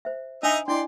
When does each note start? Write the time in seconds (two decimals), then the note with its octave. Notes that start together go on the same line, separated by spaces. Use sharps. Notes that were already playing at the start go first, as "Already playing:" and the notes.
0.05 C5 E5
0.43 D4 D#4 D#5 E5 G#5
0.68 D4 E4 D5 D#5 G5 C6